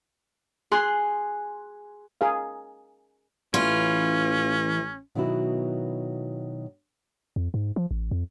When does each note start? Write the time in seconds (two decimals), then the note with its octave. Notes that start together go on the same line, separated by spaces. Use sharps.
0.72 G#4 C6 F#6
2.21 G#4 A#4 F5
3.54 A1 E3 C#4 F4
5.15 B2 D#3 F#3 B3 E4 F#4
7.36 F2
7.54 G#2
7.76 F3
7.91 A1
8.11 F2